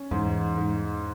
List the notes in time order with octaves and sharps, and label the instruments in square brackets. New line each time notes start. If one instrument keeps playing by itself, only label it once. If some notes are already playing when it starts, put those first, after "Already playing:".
Already playing: [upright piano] C#4
[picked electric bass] E2 E3 [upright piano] G#2
[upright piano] G#2